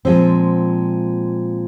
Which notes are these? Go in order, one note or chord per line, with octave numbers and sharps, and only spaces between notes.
A#2 F3 G#3 C4 C5